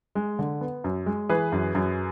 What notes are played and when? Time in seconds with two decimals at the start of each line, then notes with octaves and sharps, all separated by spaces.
0.15 G#3
0.39 D3
0.61 B3
0.84 F#2
1.06 G#3
1.29 E3 G#4 B4
1.52 F#2
1.75 F#2